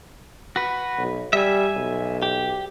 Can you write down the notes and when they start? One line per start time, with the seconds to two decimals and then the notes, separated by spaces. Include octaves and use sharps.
0.56 F#4 B4
0.98 B1
1.33 G3 E5 G#5
1.76 B1
2.22 G4